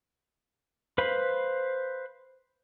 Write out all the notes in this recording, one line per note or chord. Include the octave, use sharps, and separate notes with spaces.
B4 C5 F5 B5